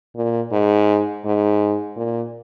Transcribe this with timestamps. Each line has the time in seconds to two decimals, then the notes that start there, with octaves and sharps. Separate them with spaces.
0.15 A#2
0.51 G#2
1.25 G#2
1.96 A#2